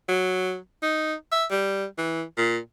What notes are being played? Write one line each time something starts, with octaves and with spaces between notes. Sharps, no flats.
F#3
D#4
E5
G3
E3
A#2